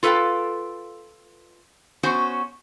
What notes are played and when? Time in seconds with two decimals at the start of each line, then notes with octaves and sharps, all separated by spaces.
0.03 F4 A4 B4 E5 F5 G5
2.03 B3 C#4 F#4 C5